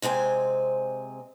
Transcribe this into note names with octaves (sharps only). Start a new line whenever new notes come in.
C3 G#3 C4 G#5